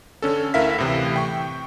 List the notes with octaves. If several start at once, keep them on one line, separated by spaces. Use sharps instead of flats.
D3 C#4 A4
D2 E4 A#4 E5 F5 B6
A2 C3 E3
G5 C#6